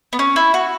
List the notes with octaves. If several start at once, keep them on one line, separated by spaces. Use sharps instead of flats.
B3
C#4
E4
F#4